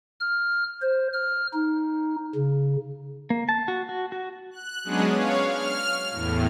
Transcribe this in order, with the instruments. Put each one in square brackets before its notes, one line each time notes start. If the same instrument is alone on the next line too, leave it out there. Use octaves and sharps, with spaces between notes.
[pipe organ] F6
C5
F6
D#4
C#3
[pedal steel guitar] A#3
A5
F#4
F#4
F#4
[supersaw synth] F#6
F#3 G#3 B3 C#4 D4 G#4
C#5 F5
F6
E2 A2